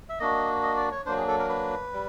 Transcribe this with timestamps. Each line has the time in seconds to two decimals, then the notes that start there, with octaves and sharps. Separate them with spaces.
0.09 E5
0.20 A#3 D4 F#4 D#5
0.63 D#5
0.77 D5
0.92 C#5
1.06 F#3 A#3 D4 C5
1.17 G#4
1.28 A4
1.39 A#4
1.49 B4
1.93 G3